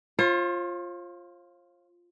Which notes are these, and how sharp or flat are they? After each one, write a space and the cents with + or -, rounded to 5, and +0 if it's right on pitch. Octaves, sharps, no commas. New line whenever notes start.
F4 +0 C5 +45